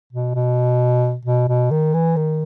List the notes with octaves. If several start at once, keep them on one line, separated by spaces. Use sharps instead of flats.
B2
B2
B2
B2
D#3
E3
D#3